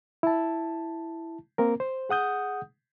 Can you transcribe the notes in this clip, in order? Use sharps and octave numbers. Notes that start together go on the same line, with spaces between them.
E4 A5
A#3 C4 A#4
C5
G#4 F#5 D#6 G6